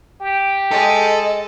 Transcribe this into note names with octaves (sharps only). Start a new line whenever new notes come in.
G4
G#3 A4 D#5